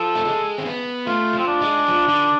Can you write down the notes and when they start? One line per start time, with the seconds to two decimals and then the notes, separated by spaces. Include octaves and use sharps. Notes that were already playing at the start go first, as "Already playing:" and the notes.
Already playing: F3 A4
0.15 A3
0.25 G#3
0.58 C4
0.65 B3
1.07 A3 F4
1.33 F3
1.39 C4
1.47 D4
1.61 G#3
1.88 F3
2.08 D3